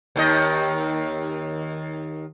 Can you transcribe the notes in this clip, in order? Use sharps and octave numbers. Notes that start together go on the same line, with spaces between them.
D#2 D#3 D#5